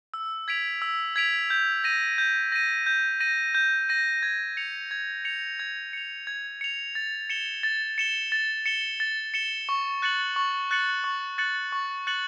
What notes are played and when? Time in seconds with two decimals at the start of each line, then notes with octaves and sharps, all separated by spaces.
0.14 E6
0.48 G#6 B6 D7 F7
0.82 E6
1.16 G#6 B6 D7 F7
1.50 G6
1.84 A#6 D#7
2.18 G6
2.52 A#6 D#7
2.86 G6
3.20 A#6 D#7
3.55 G6
3.89 A#6 D#7
4.23 G#6
4.57 C#7 F7
4.91 G#6
5.25 C#7 F7
5.60 G#6
5.93 C#7 F7
6.27 G#6
6.61 C#7 F7
6.95 A6
7.30 C#7 E7 G7
7.63 A6
7.98 C#7 E7 G7
8.32 A6
8.66 C#7 E7 G7
9.00 A6
9.34 C#7 E7 G7
9.69 C#6
10.02 F#6 A6 C#7 F#7
10.36 C#6
10.71 F#6 A6 C#7 F#7
11.04 C#6
11.38 F#6 A6 C#7 F#7
11.72 C#6
12.07 F#6 A6 C#7 F#7